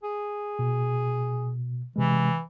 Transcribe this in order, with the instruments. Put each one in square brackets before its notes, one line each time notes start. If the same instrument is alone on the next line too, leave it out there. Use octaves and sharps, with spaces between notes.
[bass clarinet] G#4
[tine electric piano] B2
[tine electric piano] C3 G#3 [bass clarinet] E3